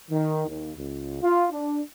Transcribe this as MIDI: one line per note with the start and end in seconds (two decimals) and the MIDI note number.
0.10 0.46 51
0.48 0.72 39
0.76 1.21 37
1.22 1.47 65
1.51 1.80 62